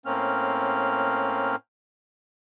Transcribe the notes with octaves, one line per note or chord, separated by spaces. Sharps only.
A2 A#3 C4 C#4 F6